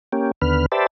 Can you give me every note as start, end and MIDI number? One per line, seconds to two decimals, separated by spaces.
0.12 0.31 58
0.12 0.31 61
0.12 0.31 67
0.42 0.66 39
0.42 0.66 50
0.42 0.66 59
0.42 0.66 71
0.42 0.66 89
0.72 0.87 67
0.72 0.87 71
0.72 0.87 72
0.72 0.87 74
0.72 0.87 76
0.72 0.87 81